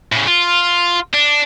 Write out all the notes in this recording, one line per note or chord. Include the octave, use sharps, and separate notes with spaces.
A2 C#3
F4
D4